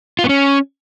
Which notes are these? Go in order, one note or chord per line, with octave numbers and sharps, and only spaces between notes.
F4
B3
C#4